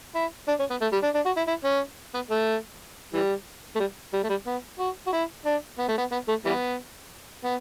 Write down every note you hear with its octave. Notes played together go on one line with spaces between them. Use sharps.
E4
D4
C#4
B3
A3
G3
D4
D4
F#4
E4
E4
C#4
B3
A3
E3 G3
A3
G3
G3
A3
G3
B3
F#4
F#4
E4
D4
B3
A3
B3
B3
A3
E3 G3 B3
B3